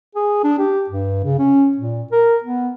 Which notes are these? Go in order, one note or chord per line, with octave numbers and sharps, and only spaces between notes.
G#4
D4
G4
G2
C#3
C#4
A#2
A#4
B3